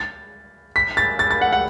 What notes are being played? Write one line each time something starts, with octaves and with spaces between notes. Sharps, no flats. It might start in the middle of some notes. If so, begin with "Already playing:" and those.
Already playing: A6
B6
A6
A6
A6
F#5
F#5